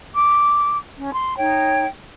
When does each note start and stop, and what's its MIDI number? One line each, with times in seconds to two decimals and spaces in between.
0.16 0.77 86
0.98 1.12 61
1.13 1.35 84
1.38 1.85 63
1.38 1.85 73
1.38 1.85 79